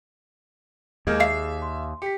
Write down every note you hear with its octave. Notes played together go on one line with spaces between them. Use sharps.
D#2 G#3 A#3 F6 G6 G#6
G#4 E5 F5 C7
C6
G4 B6 C#7